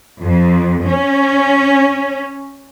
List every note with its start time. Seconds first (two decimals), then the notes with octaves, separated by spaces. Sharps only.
0.20 F2
0.86 C#4